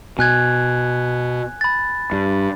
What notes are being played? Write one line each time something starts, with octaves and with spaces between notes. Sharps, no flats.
B2 G#5 F#6 G#6
B5 A6
G2